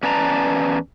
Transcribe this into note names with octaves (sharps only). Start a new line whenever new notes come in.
E2 C#4 B4 D5 A5 A#5